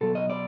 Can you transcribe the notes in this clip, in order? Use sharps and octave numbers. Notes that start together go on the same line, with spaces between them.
B2 F#3 A4
D#5
D5